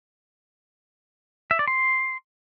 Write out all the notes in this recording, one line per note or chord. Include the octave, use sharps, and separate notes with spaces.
E5
D5
C6